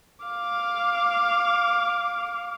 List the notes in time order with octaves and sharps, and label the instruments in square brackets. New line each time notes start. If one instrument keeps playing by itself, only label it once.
[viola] F5 D6